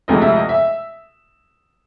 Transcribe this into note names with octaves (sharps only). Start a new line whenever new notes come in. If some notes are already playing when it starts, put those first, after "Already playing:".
D2 C3 F3 G#3 D#5
E5
D#5
E5